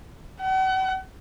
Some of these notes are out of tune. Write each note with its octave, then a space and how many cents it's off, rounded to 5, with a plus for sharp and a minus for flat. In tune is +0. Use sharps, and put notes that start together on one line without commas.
F#5 +40